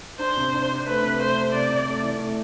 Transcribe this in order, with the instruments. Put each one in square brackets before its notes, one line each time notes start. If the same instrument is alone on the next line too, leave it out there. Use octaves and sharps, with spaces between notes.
[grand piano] D4 [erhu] C5
[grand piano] C3
D4
D4
[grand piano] A3 [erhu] B4
[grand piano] C3
[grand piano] A3 [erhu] C5
[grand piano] C3
[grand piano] C3 [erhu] D5
[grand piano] C3
A3
E3
A3